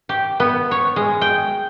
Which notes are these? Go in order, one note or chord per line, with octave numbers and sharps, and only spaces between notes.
G4
B3
C#5
G#3
G5